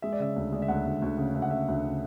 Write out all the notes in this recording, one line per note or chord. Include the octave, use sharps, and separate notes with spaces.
G#3 E5
D5
C#3 E5
D2
G#3 D5
E5
D2 F#5
D2
D2
C#3
D2 E5
F#5
C#3 E5
D2
C#3